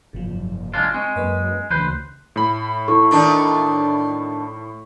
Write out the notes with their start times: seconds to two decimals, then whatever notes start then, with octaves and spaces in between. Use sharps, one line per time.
0.13 F#1 G#2 C3 F3
0.74 G#3 D4 F4
0.94 G#3 C4 C#6
1.16 F#2 A#3 B4 D#5
1.70 D2 C#3 E3 B4 C5
2.36 A2 B5
2.88 E4 A4 C#6
3.11 D#3 A3 D4